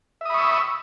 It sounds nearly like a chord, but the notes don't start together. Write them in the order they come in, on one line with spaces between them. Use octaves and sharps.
E5 D#6 B5 C#6 E6